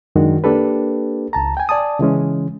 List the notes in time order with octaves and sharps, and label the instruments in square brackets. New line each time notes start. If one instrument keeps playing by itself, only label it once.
[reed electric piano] F#2 D#3 G#3 D4 F#4
A#3 D4 G4 A4 B4
C#2 A5 A#5
G5 G#5
D5 G#5 A5 D#6
C#3 E3 G#3 C#4